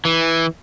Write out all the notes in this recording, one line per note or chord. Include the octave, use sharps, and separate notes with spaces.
E3